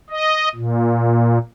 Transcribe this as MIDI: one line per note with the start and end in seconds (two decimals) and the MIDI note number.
0.10 0.49 75
0.55 1.38 46